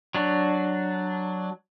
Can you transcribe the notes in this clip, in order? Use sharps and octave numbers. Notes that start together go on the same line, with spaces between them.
F#3 D4